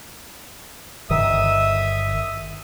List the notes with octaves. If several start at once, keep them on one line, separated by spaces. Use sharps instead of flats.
G1 D#3 E5 D#6